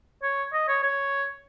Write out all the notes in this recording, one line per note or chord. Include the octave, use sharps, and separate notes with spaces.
C#5
D#5
C#5
C#5